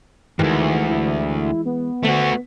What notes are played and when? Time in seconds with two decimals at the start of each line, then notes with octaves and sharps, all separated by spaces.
0.39 D2 G2 D#3 E3 G#3
0.89 E4
1.66 B3
2.05 D2 A3 F#4